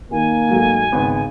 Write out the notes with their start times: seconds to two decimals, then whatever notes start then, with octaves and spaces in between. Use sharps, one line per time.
0.11 D#3 A#3 G#5
0.49 G#2 F#3 A3
0.92 G#1 C#3 B3